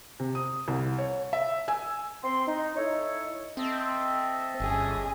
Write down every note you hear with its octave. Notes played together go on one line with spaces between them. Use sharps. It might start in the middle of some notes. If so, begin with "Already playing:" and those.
C3
D#6
C2
C#5
E5
G#5 E6
C4 C6
D#4
D#4 E4 A4 C#5
C4 A4 D#5 E5
G1 C#4 G#4